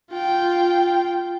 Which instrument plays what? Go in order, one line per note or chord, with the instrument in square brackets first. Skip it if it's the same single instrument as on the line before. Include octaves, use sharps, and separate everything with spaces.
[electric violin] F4 G5